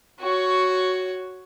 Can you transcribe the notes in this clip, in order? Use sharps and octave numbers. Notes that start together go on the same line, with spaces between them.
F#4 C#5